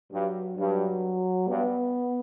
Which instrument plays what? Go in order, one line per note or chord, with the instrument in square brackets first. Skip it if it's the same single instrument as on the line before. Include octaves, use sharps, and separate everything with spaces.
[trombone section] G2 [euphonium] F#3
[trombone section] G2 [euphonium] F#3
[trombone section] G2 [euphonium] B3